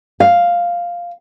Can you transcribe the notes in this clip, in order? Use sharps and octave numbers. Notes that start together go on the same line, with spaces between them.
F5